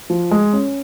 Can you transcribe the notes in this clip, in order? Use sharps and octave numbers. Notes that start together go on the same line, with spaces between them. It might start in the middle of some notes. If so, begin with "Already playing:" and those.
F3
G#3
C#4